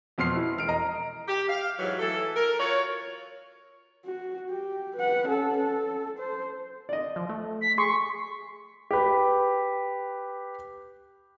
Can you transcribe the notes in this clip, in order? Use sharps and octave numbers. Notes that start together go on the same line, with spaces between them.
F2 B2 C6 F6 C7
E4
E1 F6 D7
D#5 A#5
G4
F5
G#2 E3 F#3
E3 A4
A#4
F4 F#4 C#5
F#4
G4
B4 F#5
C#4 A4
A4
C5
D5 D#5
F3
A3
B6
G#4 C6 C#6
G4 B4